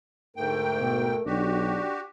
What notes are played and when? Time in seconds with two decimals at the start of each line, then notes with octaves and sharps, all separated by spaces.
0.36 D2 G#2 A3 A#4 G5
0.81 B2
1.26 B1 D4 F#4 G4